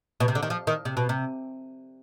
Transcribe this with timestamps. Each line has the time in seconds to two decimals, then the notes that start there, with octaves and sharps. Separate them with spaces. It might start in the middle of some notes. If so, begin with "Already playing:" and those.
0.20 B2
0.28 C3
0.35 D3
0.43 D#3
0.50 F3
0.67 D#3
0.85 C3
0.97 B2
1.09 C3